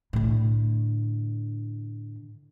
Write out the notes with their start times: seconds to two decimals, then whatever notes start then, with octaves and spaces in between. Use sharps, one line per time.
0.13 A2 D3